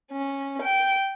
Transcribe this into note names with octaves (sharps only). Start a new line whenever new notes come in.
C#4
G5